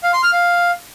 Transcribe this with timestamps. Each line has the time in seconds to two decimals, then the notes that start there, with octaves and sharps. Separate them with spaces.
0.03 F5
0.13 C6
0.23 F6
0.33 F5